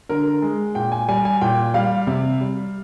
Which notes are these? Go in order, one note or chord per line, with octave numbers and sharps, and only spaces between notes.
D3 A#4
G#3
A#2 G5
G#5
G3 G#5
G#5
A#2 G5
G3 F5
C3
G3